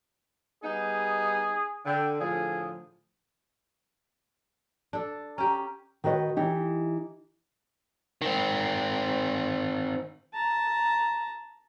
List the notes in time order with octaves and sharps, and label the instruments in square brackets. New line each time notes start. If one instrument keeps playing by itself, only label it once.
[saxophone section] G3 B3 D#4 [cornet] G#4
[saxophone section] D3 [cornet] G5
[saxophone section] A2 D3 F3 [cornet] G#4
[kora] D4 A4
[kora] C#4 G4 [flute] A#5
[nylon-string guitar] D#3 F#4 B4 D#5
E3 D#4 G4
[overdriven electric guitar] D#3 C4
[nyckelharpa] A5 A#5